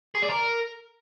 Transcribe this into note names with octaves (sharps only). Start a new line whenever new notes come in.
G#4
D5
A#4